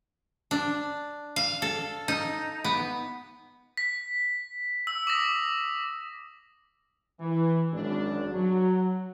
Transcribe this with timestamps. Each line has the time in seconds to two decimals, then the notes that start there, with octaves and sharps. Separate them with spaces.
0.51 D4
1.36 F5
1.62 A4
2.08 D#4
2.64 B3
3.77 B6
4.87 E6
5.07 D6 D#6 A#6
7.20 E3
7.73 G#1 F#2 D4
8.31 F#3